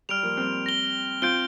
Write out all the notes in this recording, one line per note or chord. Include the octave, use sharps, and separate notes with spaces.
G3 F6 D7 F7
F3 A#3
G3 C4
A#6 G7
C4 F4 G6 D7 G7